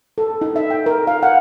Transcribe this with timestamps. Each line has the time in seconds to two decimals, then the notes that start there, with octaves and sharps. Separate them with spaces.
0.18 A4
0.41 D#4
0.56 E5
0.70 G5
0.86 A#4
1.07 F5
1.23 F#5